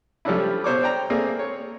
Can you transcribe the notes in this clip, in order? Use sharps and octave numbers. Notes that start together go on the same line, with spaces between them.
F3 G3 A3 C#4 D4 E4
B2 C5 C#5 D6
D5 G5 A#5
A3 A#3 C4 G#4 D5
C#5